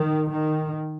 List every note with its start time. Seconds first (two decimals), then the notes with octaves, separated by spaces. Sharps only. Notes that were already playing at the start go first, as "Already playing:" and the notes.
Already playing: D#3
0.31 D#3